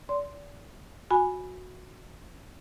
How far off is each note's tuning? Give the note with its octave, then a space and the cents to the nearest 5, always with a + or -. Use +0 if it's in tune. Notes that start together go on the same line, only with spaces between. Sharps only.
D5 -35 C6 +0
F#4 -15 G#5 +0 B5 +0